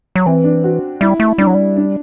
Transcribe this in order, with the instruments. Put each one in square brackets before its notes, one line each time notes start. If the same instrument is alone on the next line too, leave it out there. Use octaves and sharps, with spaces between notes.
[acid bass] F#3
[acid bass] E3 [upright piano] C4
[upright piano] D4
F#4
[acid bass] G3 [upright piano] E4
[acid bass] A3
[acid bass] G3 [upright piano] D4
[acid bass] F#3
G3
[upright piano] D4